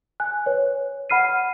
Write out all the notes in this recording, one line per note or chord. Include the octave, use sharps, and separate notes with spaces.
G#5 F#6
B4 C#5
F#5 B5 F6 C7 D#7